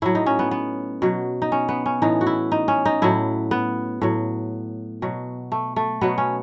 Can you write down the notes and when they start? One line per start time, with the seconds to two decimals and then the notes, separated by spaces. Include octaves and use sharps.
0.02 A2 F#3 E4
0.15 D#4
0.26 C#4
0.39 B3
0.51 B3
1.02 B2 F#3
1.42 D#4
1.52 C#4
1.69 B3
1.86 C#4
2.02 A2 E3 D#4
2.21 F#4
2.27 E4
2.52 D#4
2.68 C#4
2.85 D#4
3.02 A2 F#3 E4
3.51 B3
4.01 A2 F#3
5.02 B2 F#3
5.52 A3
5.76 A3
6.01 B2 F#3 B3
6.18 C#4